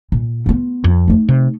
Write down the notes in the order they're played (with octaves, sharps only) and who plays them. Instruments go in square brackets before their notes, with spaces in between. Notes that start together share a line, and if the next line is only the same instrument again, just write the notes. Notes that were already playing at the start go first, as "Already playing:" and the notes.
[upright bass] A#2
B3 F4
[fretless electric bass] F2
[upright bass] A3 D#4
[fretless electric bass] C3